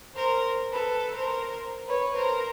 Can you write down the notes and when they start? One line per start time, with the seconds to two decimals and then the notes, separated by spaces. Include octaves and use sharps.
0.15 A#4 C5
0.72 A4 B4
1.15 A#4 C5
1.87 B4 C#5
2.16 A#4 C5